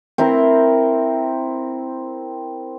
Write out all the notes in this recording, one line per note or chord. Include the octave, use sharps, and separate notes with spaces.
C4 E4 A#4